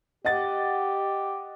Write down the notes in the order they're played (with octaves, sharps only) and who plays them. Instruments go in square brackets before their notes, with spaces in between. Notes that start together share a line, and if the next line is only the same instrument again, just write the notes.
[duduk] G4 [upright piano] D#5 F#5 A6